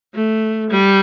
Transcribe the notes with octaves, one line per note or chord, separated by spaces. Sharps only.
A3
G3